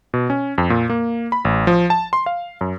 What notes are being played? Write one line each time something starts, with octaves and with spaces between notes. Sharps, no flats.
B2
C#4
F2
A#2
A#3
B5
A1
F3
A5
C6
F5
F#2